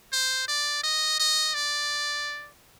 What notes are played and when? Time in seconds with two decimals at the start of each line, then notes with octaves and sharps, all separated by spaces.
0.12 C5
0.48 D5
0.83 D#5
1.19 D#5
1.55 D5